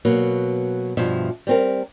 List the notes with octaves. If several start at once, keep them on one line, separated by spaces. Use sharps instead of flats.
B2 F#3 A#3
G2 B2 F3 E5
G3 C4 A#4